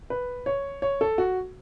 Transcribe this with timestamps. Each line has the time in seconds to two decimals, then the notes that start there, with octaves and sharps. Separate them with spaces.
0.10 B4
0.46 C#5
0.82 C#5
1.01 A4
1.18 F#4